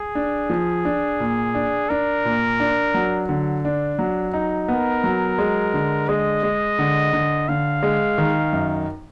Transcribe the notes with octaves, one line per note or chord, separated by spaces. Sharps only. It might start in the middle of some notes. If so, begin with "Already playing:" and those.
Already playing: G#4
D4
F3
D4
A#2
D4
D4 A#4
A#2
D4
F#3
D3
D4
F#3
D#4
B3 A#4
F#3
G#3
D3
G#3 D#5
G#3
D3
D3
D3 F5
G#3
D#3
F#2